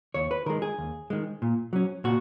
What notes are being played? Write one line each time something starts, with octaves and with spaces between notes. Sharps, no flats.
D#2 C#5
B4
D#3 G#3 A#4
G#4
D#2
D#3 G#3
A#2
F#3 C#4
A#2 F#4